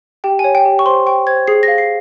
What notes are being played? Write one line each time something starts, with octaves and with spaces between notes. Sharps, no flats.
G4 G5
G#5
C#5
G5
G4
C#6
C5 C6
G5 C#6
C5 G#6
G#4 C7
A#6
F5
C7